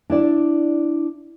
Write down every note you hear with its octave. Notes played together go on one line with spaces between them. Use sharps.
D4 E4 D5